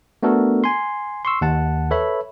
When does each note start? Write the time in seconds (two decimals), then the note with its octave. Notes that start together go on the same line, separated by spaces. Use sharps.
0.23 A3 B3 D4 F#4 A4 A#4
0.64 G#5 C6
1.25 C6 C#6 E6
1.41 D#2 F#5 A5
1.91 A4 B4 C#5 E5 B5